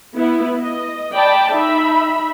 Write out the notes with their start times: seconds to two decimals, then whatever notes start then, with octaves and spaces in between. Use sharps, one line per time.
0.18 B3 E4
0.62 D#5
1.15 D5 G5 A5 B5
1.54 D#4 E5 B5